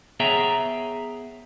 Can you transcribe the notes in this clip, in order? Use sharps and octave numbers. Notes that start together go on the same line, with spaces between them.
B3 G#4 C#5 E5 G5 A#5